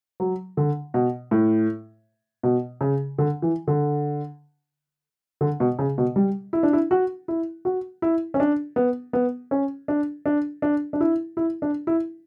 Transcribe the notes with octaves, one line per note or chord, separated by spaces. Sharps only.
F#3
D3
B2
A2
B2
C#3
D3
E3
D3
D3
B2
C#3
B2
G3
E4
D4
E4
F#4
E4
F#4
E4
C#4
D4
B3
B3
C#4
D4
D4
D4
D4
E4
E4
D4
E4